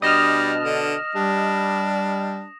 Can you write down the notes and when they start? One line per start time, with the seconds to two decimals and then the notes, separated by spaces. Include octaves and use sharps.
0.02 B2 G3 D4 D#5 D#6 F6 A#6 E7
0.64 D3
1.15 G3 D4